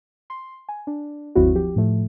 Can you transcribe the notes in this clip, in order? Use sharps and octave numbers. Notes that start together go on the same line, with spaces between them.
C6
G#5
D4
G1 D#2 F#3 C4 E4 F#4
F3 G4
A2 F3 A3